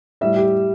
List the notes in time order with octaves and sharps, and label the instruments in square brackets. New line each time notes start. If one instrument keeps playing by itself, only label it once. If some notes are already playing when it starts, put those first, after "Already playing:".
[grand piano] A2 G3 E5
G4